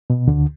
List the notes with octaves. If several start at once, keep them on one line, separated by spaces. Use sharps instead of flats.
B2
D2 D3